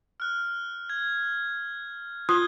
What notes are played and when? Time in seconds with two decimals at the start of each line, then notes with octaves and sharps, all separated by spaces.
0.20 F6 F#6
0.89 G#6
2.29 F4 D#6 F#6 G#6 G7